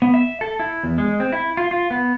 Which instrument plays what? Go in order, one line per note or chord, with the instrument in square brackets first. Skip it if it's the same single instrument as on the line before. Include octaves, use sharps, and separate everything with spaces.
[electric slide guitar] B3
E5
A4
E4
E2
G#3
C4
E4
F4
F4
B3